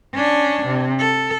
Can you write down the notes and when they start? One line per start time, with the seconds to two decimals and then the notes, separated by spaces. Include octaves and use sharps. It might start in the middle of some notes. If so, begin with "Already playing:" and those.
0.14 C#4 D4
0.67 C3
1.00 A4